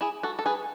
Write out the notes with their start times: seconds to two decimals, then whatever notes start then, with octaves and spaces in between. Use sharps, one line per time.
0.01 E4 G#4
0.23 F#4 A4
0.39 A4
0.46 G#4 B4